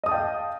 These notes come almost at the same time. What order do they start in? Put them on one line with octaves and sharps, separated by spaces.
D#5 D#6 A5 G5 F5